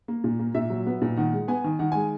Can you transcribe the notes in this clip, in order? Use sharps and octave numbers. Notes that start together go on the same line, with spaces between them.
A#3
A#2
A#3
A#2 E5
F#3
B3
A#2
D#3 F#5
G#3
B3 G#5
D#3
D#3 F#5
G#3 G#5